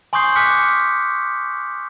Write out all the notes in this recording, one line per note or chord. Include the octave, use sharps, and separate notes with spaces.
G#5 C6 C#6 D#6 G6 C7
G#5 D6 F6 F#6 B6 C#7